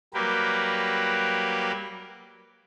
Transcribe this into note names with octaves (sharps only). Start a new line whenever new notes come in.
F#3 G3 A#3 G4 A#4 B4